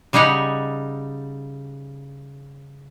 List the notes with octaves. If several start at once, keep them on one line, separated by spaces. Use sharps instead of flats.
C#3 G3 D#4 C#5 F#5